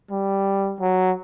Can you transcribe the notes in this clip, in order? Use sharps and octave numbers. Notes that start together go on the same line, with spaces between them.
G3
F#3